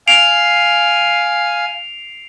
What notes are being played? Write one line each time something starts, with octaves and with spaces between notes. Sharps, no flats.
F5 G#5 C7 D7 F7